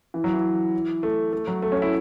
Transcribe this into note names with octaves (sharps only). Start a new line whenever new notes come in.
E3
F#3
E3
A3
A3
F#3
A3
C#4
E4